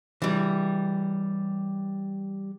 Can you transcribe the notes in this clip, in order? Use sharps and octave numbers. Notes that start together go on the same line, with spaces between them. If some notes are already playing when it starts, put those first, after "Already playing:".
E3 G3